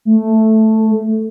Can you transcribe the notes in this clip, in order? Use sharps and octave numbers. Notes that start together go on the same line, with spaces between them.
A3